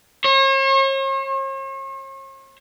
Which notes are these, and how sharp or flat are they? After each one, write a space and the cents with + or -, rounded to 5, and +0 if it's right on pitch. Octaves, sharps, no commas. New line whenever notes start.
C#5 -45